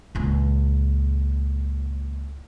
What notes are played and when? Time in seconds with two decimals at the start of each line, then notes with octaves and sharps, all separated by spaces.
0.15 C#2 A#2